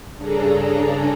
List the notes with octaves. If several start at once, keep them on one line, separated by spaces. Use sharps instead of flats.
G2 C#3 D4 G#4 A4 A#5